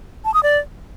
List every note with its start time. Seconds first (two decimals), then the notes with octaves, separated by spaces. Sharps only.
0.25 A5
0.34 D#6
0.43 D5